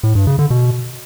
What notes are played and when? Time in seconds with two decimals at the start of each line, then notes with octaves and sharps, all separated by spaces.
0.03 A2
0.15 G2
0.27 C#3
0.39 D3
0.50 B2